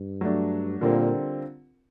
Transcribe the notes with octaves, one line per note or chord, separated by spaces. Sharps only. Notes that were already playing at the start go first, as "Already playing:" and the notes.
Already playing: G2
F#3 A3 D4
A#2 D3 G3 C4 F4 A#4